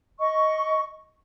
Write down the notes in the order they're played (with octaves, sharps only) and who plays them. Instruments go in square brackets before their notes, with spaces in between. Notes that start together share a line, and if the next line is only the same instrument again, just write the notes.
[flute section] D#5 C#6